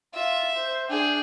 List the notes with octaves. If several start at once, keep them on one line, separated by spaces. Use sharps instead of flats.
F4 E5
C5
D4 G#4 G5